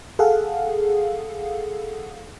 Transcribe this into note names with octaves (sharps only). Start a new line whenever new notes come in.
G#4 A4 F5 F#5